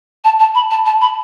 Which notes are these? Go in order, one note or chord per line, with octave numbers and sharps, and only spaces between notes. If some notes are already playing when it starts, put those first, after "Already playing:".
A5
A5
B5
A5
A5
B5